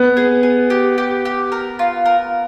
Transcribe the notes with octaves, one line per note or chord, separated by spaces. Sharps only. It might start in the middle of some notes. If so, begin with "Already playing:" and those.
Already playing: B3
G#4
G#4
G4
G4
G4
A#4
F4
A#4